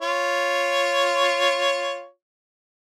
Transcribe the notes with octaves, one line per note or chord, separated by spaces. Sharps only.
F4 C#5